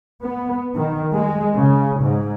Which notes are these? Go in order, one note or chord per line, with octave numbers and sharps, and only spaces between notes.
B3
D#3
G#3
C#3
G#2